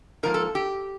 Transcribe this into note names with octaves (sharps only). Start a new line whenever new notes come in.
G#2 F3 A#3 A#4
A4
G4